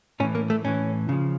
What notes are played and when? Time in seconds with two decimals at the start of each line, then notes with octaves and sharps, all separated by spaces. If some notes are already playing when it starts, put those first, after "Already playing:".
0.20 A2 C#4
0.23 E3
0.35 A#3
0.50 A3
0.64 A2 E3 C#4
1.09 C#3 F3